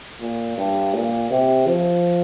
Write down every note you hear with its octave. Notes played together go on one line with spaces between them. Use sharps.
A#2
G2
A#2
C3
F3